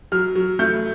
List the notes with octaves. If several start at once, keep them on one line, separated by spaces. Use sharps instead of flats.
F#3 F6
F#3
A3 G6